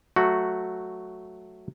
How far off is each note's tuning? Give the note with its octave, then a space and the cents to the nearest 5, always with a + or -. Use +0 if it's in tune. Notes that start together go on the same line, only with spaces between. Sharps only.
F#3 +0 A3 +0 F#4 +0